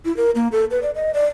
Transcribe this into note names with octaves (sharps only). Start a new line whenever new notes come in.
E4
A#4
A#3
A4
B4
D5
D#5
D5